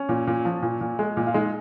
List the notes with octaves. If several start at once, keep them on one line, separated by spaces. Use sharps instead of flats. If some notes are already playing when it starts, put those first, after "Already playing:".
Already playing: C#4
A#2
A#2
F3
A#2
A#2
G#3
A#2
F4
G#3 D#4